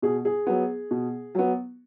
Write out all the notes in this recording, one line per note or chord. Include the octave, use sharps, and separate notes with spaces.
B2 G#4
G#4
F#3 B3
B2
F#3 B3